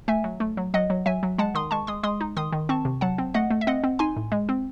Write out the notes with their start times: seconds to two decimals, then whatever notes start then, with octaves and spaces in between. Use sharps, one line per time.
0.08 A3 E5 G#5
0.24 F#3
0.40 A3
0.57 F#3
0.74 F#3 D#5 F#5
0.90 F#3
1.06 F#3 E5 G#5
1.23 F#3
1.38 G#3 F#5 A5
1.55 D#3 C6 D#6
1.71 G#3 A5 C#6
1.87 G#3 C6 D#6
2.03 G#3 C6 D#6
2.21 D#4
2.37 D#3 C6 D#6
2.52 D#3
2.69 C4 A5 C#6
2.85 C3
3.01 F#3 F#5 A5
3.18 C4
3.34 A3 D#5 F#5
3.50 A3
3.61 E5
3.67 C4 D#5 F#5
3.84 C4
3.99 D#4 G#5 C6
4.16 A2
4.32 G#3
4.49 C4